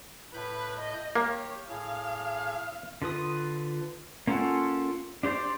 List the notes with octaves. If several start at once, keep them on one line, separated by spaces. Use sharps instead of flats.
A2 B4 B5 G6
D#5
A#3 G4 C#5
A2 G#4 F5
D3 F4 B4 D#6
A#3 C#4 F4 A4 F#5
D4 G4 C5 D5 D6